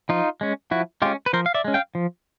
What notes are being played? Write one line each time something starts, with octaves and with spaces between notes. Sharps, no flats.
F3 D#4 F4
G#3 C#4
F3 E4 F#4
G#3 C#4 F4 G4
B4
F3 A#4 C5
F5
D5 E5
G#3 C#4
F5 G5
F3